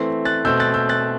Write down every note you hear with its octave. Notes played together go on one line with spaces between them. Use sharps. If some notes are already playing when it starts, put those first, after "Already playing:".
Already playing: E3 A3 C4
F#6 A6
B2 A3 C4 E6 G6
F#6 A6
E6 G6
F#6 A6